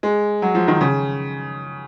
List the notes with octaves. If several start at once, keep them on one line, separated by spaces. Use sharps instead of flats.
G#3
F#3
F3
D#3
C#3